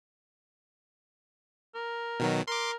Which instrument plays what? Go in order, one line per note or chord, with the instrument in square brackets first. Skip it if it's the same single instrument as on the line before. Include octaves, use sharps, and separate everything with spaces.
[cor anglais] A#4
[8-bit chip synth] B2 D#3 F#3
[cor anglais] A#4 [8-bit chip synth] C6 D6